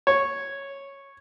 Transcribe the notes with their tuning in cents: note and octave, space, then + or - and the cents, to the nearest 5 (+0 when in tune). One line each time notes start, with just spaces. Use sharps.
C#5 -5